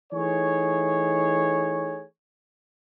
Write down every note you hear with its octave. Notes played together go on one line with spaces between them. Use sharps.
E3 A3 D#4 G#4 C#5